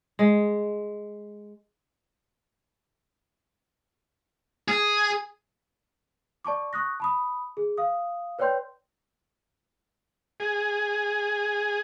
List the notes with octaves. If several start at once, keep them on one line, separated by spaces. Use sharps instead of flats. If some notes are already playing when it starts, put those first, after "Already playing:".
G#3
G#4
D5 A5 C#6 D6
C#6 D#6 F#6 A#6
A5 B5 D#6
G#4
F5 D#6
B4 C#5 D5 G5 C6 G6
G#4